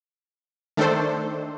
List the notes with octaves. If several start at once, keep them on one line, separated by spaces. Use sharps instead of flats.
D#3 A3 D4 A4 C5